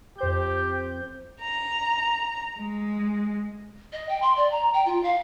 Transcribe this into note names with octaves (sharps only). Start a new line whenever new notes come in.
F2 G4 C5 G6
A#5
G#3
D#5
G5
C6
D5
A#5
G5
F4
F5